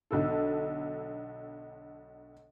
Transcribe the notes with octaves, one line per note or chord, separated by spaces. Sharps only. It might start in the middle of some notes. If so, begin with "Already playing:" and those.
B1 D3 A4